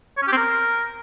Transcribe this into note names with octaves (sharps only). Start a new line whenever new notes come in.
C#5
C#4
G4
C4
A#4